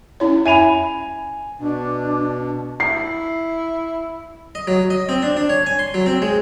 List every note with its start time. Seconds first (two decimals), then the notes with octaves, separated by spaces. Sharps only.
0.20 C#4 E4 C#5
0.45 E5 G#5 B5 D#7 F7
1.58 B2 D4
2.80 E4 C7
4.55 D#5
4.67 F#3
4.90 D#5
5.09 C4
5.23 D4
5.37 D4
5.49 C#5
5.66 G#5
5.79 C6
5.94 F#3
6.06 C4
6.22 G#3